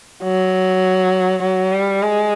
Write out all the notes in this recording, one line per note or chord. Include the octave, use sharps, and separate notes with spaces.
F#3
F#3
G3
G#3